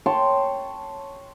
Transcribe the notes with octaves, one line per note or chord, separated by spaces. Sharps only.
C#5 G5 A5 C6